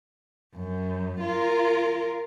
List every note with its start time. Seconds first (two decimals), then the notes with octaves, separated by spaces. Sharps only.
0.55 F#2
1.20 F4 A#4